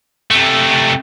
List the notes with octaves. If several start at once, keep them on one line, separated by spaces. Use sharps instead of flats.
C3 A3